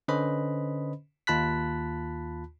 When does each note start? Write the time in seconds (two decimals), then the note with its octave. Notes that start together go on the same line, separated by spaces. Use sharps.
0.08 D3 C#4 B4 C5 D#5 B5
1.27 D#2 F4 A5 B5 F#6 B6